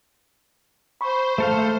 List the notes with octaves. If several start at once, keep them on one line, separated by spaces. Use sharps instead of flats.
C5 B5 C#6
A3 A4 F5